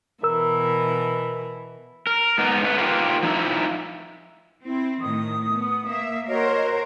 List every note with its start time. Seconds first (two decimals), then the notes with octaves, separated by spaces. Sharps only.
0.23 B2 E3 A#4 E5 E6
2.07 A#4
2.38 G#2 B3 D#4
2.64 A3 B4
2.78 D#4 F4 G4 A#4 C5
3.23 F3 D#4 E4
4.64 C4 E4
5.01 A2 D#3 D#6
5.52 B3
5.87 A#3 E5
6.28 F#4 A#4 C5 C#5 D#5